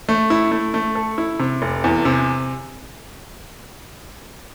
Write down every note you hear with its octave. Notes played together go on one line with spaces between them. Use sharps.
A3
E4
A3
A3
A4
E4
C3
F1
E2
C3